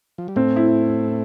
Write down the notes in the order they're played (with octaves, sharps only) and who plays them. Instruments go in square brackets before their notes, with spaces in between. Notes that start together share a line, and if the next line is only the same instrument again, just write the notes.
[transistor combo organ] F3
G3
[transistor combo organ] A2 A3 [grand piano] C4
[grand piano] E4